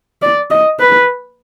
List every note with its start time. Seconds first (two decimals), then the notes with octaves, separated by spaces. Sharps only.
0.22 D5
0.51 D#5
0.80 B4